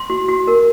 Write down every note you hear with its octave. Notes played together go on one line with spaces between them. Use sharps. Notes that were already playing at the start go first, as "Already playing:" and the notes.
Already playing: C6
F#4
F#4
A#4